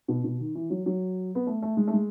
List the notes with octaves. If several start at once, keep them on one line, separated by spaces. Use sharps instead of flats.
B2
B2
D#3
E3
F#3
F#3
B3
A3
A3
G#3
A3
G#3